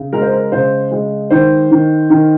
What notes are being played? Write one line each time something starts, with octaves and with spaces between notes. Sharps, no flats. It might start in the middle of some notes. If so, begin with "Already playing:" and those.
Already playing: C#3
G#3 A#4
C5
A#4
C#3 C5
G#3
D#3 C5
D#3
D#3